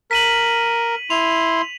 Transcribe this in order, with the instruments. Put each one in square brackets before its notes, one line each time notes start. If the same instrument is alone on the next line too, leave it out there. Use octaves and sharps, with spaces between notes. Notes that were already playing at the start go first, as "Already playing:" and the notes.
[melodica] A#4 [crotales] B6 D#7 F#7
[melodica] E4 C6 [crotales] F7